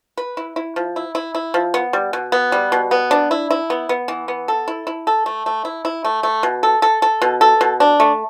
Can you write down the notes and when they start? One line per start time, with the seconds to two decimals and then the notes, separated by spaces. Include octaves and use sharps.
0.17 B4
0.37 E4
0.56 E4
0.76 F3
0.96 E4
1.15 E4
1.35 E4
1.54 F3
1.74 B3
1.93 G3
2.13 B2
2.32 B3
2.52 G3
2.72 B2
2.91 B3
3.11 D4
3.31 E4
3.51 E4
3.70 B3
3.89 B3
4.08 E3
4.28 B3
4.48 A4
4.68 E4
4.87 E4
5.07 A4
5.26 A3
5.46 A3
5.65 E4
5.85 E4
6.05 A3
6.23 A3
6.43 B2
6.63 A4
6.82 A4
7.02 A4
7.22 B2
7.41 A4
7.61 B2
7.80 D4
8.00 A3